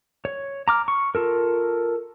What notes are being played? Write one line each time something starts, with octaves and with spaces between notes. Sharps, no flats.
C#5
A#5 D6 F6
C#6
F4 A4 A#4